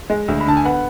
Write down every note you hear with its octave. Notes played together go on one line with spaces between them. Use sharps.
G#3
D2
B5
D3 A5
G#5
B3 F#5